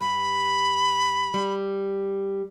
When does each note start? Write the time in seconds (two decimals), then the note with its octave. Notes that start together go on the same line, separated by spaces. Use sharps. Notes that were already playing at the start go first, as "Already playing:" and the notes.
0.01 G2 B5
1.34 G3